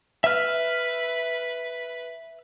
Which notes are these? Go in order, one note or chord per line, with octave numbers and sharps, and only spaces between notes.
B4 E5 F6